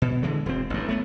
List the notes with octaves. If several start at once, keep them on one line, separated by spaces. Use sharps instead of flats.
B2
D3 E3 G#3
E1 C4
A1 G2
A3 B3